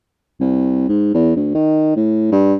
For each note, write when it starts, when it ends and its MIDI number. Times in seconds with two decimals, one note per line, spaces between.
0.40 0.85 36
0.89 1.14 44
1.14 1.34 40
1.36 1.51 38
1.55 1.95 51
1.96 2.30 45
2.32 2.56 43